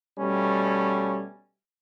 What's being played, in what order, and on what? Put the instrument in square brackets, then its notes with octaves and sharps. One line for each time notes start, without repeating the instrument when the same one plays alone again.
[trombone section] B2 G3 A3 C#4